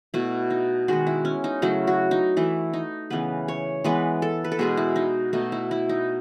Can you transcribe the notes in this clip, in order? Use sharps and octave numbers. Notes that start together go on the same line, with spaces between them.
B2 A3 E4
D#4
D#3 G#3 B3 F#4
E4
C#4
D#4
C#3 F#3 A3 E4
F#4
D#4
E3 A3 E4
D#4
C#3 E3 B3 B4
C#5
E3 G#3 B3 B4
A4
B4
A4
B2 G#3 B3 G#4
E4
D#4
B2 A3 D#4
E4
E4
D#4